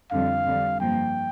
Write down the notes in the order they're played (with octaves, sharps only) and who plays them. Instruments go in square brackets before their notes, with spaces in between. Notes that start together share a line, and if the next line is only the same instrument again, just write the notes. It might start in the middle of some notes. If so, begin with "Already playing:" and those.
[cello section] F2 D3 G3 [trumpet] F5
[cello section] F2 D3 G3
[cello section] G2 F3 A#3 [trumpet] G5